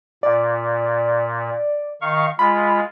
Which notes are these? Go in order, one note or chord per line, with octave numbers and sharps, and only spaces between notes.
A#2 D5
D#3 F5 C#6
G#3 F4 B5